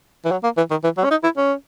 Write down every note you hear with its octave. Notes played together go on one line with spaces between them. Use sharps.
E3
F#3
A#3
E3
D#3
E3
F#3
C#4
D#4
E4
C#4